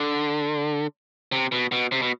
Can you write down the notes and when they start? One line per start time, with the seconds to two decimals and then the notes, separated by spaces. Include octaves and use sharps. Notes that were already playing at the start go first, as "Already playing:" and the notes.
Already playing: D3
1.32 C3
1.52 B2
1.72 B2
1.92 C3
2.02 B2